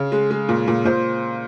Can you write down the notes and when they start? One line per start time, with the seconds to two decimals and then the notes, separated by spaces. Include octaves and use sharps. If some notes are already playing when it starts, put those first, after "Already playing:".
Already playing: C#3
0.12 G#3
0.30 G#3
0.49 A#2
0.67 A#2
0.85 A#2 C5